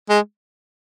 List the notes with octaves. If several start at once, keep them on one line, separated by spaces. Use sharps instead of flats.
G#3